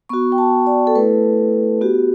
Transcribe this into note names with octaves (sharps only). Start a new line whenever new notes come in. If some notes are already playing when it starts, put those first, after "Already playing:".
B3 F#4 C#6
G5
A5
D5
A4
A3 E4 B4
B3 F#4 G4